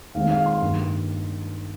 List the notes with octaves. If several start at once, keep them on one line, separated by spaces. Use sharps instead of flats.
D#2 D#3 G#3 C4 F5
F5
C6
G2 D#3 A#3